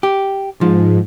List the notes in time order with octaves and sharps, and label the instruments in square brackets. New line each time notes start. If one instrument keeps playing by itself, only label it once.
[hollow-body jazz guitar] G4
[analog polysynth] G#2 [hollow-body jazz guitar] F3